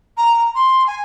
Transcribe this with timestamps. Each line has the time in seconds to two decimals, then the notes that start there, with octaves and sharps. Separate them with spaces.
0.17 A#5
0.54 C6
0.86 G#5